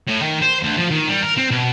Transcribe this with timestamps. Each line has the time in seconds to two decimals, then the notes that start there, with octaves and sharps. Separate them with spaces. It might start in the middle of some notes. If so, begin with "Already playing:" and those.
0.08 A2
0.23 D#3
0.42 C5
0.63 D2
0.78 F3
0.91 D#3
1.09 G3
1.23 A#4
1.37 C4
1.51 B2